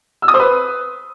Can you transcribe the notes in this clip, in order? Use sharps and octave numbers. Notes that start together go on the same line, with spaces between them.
E6
D#6
C5
B4